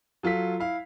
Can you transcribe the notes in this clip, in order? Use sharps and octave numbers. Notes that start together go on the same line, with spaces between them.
F#3 F4 A4 B6
E4 F5